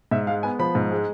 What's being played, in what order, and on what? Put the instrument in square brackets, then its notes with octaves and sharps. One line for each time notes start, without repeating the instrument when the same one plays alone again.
[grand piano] G#2 E5
G#3 F5
B3 G#5
F3 B5
G#2
G#3